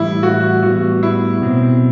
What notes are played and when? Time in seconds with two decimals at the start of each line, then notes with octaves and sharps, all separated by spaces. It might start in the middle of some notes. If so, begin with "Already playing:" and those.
Already playing: A2 E3 G3 E4
0.23 F#4
0.63 A2 G3 B3 F#4
1.03 E4
1.42 B2 F#3 C4